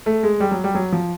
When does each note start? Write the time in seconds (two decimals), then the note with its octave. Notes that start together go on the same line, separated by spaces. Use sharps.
0.06 A3
0.23 G#3
0.40 G3
0.52 F#3
0.64 G3
0.75 F#3
0.92 F3